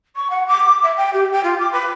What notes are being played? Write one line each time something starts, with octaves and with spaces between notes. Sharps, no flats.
C#6
F#5
D6
E5
G5
G4
G5
F4
D6
B4